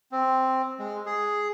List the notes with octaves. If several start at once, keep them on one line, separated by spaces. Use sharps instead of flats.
C4
G#3
G#4